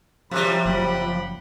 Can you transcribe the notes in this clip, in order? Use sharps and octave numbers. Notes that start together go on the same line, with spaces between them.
F#2 C3 F3 G3 C#4 B5
F#1 F#2 F#3 F#5 G5 B5